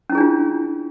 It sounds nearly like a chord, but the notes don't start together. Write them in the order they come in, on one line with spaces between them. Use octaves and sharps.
C#4 E4 G#4 D4 F4